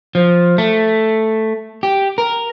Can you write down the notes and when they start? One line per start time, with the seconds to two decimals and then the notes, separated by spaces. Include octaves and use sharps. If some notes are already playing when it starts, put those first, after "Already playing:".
0.15 F3
0.58 A3
1.83 G4
2.18 A#4